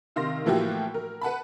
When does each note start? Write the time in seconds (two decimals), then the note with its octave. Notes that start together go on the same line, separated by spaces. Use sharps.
0.16 C3 D#3 F5 C6 A#6
0.46 A2 E3 F3 A#3 F#4 G4
0.94 A#4
1.21 B4 F#5 A5 B5